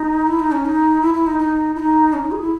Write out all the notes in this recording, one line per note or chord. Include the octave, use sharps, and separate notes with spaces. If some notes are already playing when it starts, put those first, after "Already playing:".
Already playing: D#4
E4
D#4
C#4
D#4
E4
E4
D#4
D#4
E4
D#4
C#4
D#4
G#4
E4